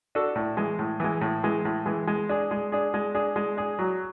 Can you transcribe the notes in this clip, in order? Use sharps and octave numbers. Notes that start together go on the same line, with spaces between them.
D4 F#4 A4
A2
E3 G#3
A2
E3 G#3
A2
E3 G#3
A2
E3 G#3
G#3
D4 G#4
G#3
D4 G#4
G#3
D4 G#4
G#3
D4 G#4
F#3